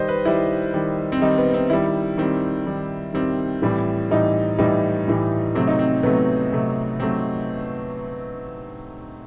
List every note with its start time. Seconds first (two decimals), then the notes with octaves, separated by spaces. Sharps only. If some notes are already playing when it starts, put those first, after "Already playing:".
Already playing: D#3 G3 C5 D#5
0.08 B4
0.25 D#3 G3 E4
0.74 D#3 G3
1.12 C4
1.21 D#3 G3 D#4
1.38 B3
1.54 C4
1.70 D#3 G3 E4
2.18 D#3 G3 C4
2.67 D#3 G3
3.14 D#3 G3 C4
3.62 A2 E3 G3
4.11 A2 E3 G3 D#4
4.59 A2 E3 G3 D#4
5.08 A2 E3 G3
5.55 C3 F#3 A3 C4
5.67 D#4
5.79 C4
6.03 C3 F#3 A3 B3
6.52 C3 F#3 A3
7.00 C3 F#3 A3 C4